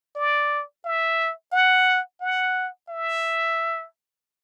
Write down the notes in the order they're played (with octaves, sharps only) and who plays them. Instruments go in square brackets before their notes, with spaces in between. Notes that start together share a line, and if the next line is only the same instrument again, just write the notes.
[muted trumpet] D5
E5
F#5
F#5
E5